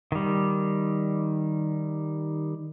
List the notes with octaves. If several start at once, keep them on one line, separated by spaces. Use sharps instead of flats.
D#3 G3